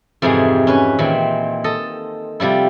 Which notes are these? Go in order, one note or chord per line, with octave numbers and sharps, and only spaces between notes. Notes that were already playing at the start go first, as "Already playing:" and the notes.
F2 G#2 C3 E3 G#4
C#4 B4 G#5
A#2 D#3 E3 C4
A4 D#5
C3 F3 G3 E4